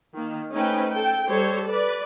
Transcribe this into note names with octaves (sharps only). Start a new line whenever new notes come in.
D#3 A#3
A3 C#4 D#4 B4 C5 G5
A4 G5
G3 A4 C5 C#5
B4 D5